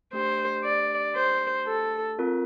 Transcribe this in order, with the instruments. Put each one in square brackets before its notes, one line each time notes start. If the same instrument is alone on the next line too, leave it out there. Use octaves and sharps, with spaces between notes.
[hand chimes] A3 D4 G4 [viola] C5
[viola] D5
C5
A4
[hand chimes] C4 F4 A#4